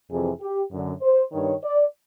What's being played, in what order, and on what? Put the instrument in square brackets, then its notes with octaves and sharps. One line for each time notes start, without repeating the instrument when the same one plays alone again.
[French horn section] F2 C3 E3 G#4
G4
F#2 D3
C5
G2 D#3 C#5
D5